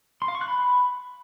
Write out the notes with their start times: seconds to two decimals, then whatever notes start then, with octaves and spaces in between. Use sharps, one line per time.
0.22 C6
0.28 F5
0.35 C#6
0.41 F#6
0.48 B5